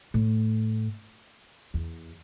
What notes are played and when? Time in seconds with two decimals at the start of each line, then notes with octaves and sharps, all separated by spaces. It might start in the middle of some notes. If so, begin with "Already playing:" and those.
0.14 A2
1.74 E2